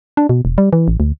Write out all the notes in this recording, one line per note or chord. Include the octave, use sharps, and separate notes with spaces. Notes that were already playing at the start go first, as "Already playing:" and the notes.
D4
B2
E1
G3
E3
A1
D2